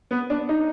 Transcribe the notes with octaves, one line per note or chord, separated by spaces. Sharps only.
B3
D4
D#4